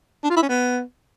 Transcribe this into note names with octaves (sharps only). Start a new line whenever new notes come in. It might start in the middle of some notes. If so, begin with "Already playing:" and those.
D4
F4
E4
C#4
B3